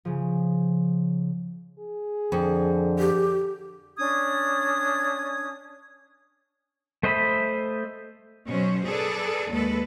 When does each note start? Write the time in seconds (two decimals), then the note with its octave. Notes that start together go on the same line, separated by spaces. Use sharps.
0.05 C#3 F3
1.79 G#4
2.32 F2 D3
2.99 G4
3.98 C#4 D4 D#6 G#6
7.03 A3 C5 D#5 E5 B5
8.48 B2 F#3 C#4 C5
8.87 G#4 A4 B4 D5
9.51 D#2 G#3 A4 B4